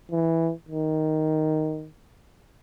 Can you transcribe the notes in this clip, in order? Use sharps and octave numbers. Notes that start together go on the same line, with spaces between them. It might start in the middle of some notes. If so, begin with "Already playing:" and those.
E3
D#3